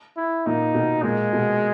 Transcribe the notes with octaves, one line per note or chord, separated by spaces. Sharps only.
E4
A#2 D#4
B2
A#2 G#3
B2